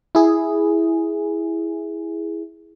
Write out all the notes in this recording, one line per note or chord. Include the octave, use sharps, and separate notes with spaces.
E4 G#4